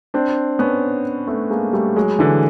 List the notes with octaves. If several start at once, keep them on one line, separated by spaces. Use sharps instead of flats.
C4 D4
B3 C#4
A3 B3
G#3 A#3
G3 A3
F#3 G#3
D3 E3